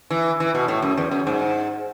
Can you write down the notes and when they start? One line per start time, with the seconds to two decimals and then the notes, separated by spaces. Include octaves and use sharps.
0.11 E3
0.40 E3
0.55 B2
0.68 A2
0.82 F#2
0.97 E2
1.11 F#2
1.27 G#2